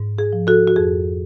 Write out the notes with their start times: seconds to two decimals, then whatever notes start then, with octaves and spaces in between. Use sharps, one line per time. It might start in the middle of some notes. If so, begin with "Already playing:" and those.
Already playing: G#2
0.18 G#4
0.33 F3
0.47 F#4 A4
0.67 F#4
0.76 F2 G#4